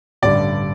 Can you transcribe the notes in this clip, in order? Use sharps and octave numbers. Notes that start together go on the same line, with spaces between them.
A1 G2 D3 G3 D5